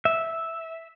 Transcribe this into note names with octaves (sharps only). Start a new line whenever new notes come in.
E5